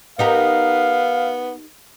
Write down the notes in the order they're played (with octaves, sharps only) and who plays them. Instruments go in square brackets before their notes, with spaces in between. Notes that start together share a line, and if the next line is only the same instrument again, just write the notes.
[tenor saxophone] B3 [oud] D#4 G4 A#4 [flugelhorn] F5